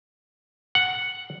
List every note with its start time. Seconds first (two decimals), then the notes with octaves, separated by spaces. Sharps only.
0.75 F#5